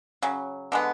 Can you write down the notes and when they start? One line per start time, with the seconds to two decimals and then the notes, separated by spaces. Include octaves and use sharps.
0.23 C#3 F#3
0.72 D3 G#3 B3